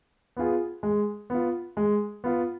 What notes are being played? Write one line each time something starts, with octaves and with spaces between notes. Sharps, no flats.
B3 F4 G#4
G#3
B3 F4
G#3
B3 F4